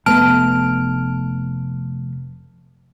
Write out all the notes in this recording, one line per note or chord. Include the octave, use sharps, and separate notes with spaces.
F1 A3 B3 A5 F6 D7